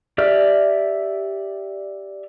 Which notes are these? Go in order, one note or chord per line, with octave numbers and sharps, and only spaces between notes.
G4 D5 E5 F6